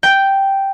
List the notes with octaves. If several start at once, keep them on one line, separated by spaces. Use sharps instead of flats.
G5